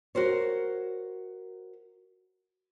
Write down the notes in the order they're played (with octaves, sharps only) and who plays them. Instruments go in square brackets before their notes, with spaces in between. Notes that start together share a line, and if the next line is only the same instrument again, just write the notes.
[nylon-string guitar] F#4 A#4 C5 C#5